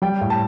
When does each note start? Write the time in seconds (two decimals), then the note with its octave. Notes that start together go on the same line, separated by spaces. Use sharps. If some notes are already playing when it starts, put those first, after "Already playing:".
0.02 G3 G5
0.21 A2
0.30 A5